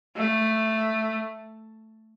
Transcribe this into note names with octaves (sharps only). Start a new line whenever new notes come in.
A3